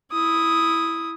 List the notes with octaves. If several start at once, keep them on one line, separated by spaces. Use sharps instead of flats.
E4 D#6